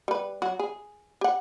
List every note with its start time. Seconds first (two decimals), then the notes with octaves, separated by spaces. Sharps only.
0.08 G3 B4
0.42 F#3 F#4
0.59 G#4
1.21 G4 F#5